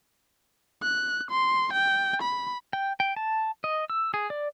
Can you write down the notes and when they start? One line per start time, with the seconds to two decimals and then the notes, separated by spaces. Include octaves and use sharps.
0.83 F#6
1.31 C6
1.73 G5
2.22 B5
2.73 G5
3.00 G5
3.17 A5
3.64 D#5
3.90 E6
4.14 G#4
4.30 D5